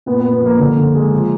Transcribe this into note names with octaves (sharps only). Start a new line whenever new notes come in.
A#2 B3
B3
A#2
B3
F3 A#3
D3
D3
G#3
F3